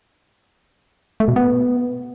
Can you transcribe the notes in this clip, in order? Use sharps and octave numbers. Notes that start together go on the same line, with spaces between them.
A3
B2
B3